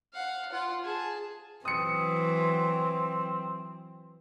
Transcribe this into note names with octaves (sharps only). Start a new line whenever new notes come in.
F5 F#5
F4 F#5
G#4 A5
E3 F#3 C4 D#6 C#7